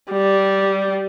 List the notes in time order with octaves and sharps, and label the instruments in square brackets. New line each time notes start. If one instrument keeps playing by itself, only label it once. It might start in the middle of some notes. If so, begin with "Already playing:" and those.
[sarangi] G3